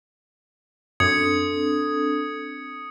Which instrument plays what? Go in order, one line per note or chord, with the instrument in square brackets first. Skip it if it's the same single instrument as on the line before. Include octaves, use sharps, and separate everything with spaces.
[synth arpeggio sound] F#2 [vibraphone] C4 D4 A4 [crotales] D#6 G#6 C#7